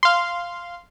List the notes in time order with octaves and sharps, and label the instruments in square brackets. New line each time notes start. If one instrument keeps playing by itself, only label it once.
[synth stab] F5 C6